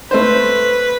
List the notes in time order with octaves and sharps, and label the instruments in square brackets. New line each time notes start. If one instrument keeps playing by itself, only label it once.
[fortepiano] A3 C5 [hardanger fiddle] B4